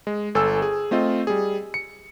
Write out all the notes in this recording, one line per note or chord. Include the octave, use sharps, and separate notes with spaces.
G#3
G1 A4 G#5 E6
G#4
A3 C4 F4 D#5
G3 G#4
C#7